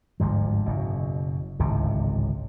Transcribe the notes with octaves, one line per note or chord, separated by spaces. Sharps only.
G1 D2 G#2 F3
F#1 F#2 B2
D1 G#1 C#2 C3